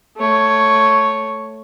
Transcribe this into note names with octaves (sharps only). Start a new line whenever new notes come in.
A3 C#5